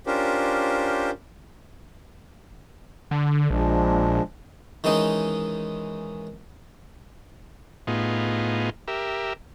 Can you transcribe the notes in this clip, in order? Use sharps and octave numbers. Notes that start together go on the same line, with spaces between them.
C#4 D4 F4 G4 A#4 C5
D3
A#1 F3 G#3 D4
D#3 E3 G#3 C#4 D#4
A2 B3 D#4 F4 G#4
G4 A#4 E5